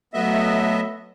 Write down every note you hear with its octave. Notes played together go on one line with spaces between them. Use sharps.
F#3 A3 B3 D#5 E5